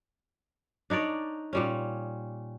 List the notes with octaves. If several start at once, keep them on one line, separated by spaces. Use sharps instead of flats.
D4 D#4 C#5 D5
A#2 G3 C#4